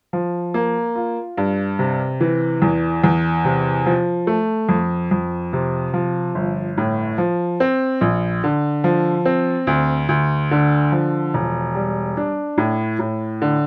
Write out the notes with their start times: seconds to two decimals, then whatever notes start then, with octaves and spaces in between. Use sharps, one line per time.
0.13 F3
0.54 A#3
0.95 F4
1.37 G2
1.79 C3
2.21 E3
2.62 E2
3.04 E2
3.45 C3
3.86 F3
4.27 A3
4.69 F2
5.11 F2
5.53 C3
5.94 F3
6.35 G1
6.77 A2
7.18 F3
7.60 C4
8.01 A#1
8.44 D3
8.84 F3
9.25 C4
9.67 D2
10.09 D2
10.51 D3
10.92 F3
11.34 E1
11.75 G3
12.17 D4
12.58 A2
12.99 A2
13.42 D3